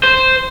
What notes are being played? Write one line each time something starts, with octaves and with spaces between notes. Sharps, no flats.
C5